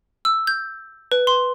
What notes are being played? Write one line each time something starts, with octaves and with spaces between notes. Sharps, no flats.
E6
G6
B4
C6